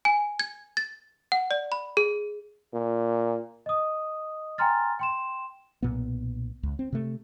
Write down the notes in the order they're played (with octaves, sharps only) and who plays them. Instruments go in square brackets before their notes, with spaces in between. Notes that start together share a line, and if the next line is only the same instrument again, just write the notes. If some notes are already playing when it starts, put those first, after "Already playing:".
[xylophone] G#5
G#6
A6
F#5
D5
B5
G#4
[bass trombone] A#2
[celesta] D#5 D#6
G5 G#5 A#5 C6 F6 A6
G5 C6 E7
[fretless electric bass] B1 A#2 B3
C#2
C4
C3 A3